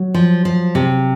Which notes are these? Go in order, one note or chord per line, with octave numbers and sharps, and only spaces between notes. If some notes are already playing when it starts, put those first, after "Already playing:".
Already playing: F#3
F3
F3
C3